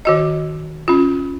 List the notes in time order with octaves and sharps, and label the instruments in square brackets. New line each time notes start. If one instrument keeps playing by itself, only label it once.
[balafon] D#3 F#4 D#5
C#4 F4